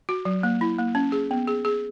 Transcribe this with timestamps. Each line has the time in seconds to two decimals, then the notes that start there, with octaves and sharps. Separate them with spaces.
0.09 F#4
0.25 F#3
0.43 A#3
0.61 E4
0.78 A#3
0.95 C#4
1.12 G#4
1.31 B3
1.48 G#4
1.65 G#4